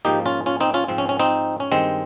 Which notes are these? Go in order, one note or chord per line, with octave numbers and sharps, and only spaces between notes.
G#2 F3 A#3 D#4 G4
C#4 F4
C#4 F4
C4 D#4
C#4 F4
G#2 F3 C4
C#4
C#4
C4 D#4
C#4
G2 D#3 G#3 C4